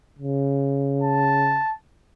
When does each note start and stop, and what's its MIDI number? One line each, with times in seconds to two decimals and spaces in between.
0.19 1.61 49
1.03 1.73 81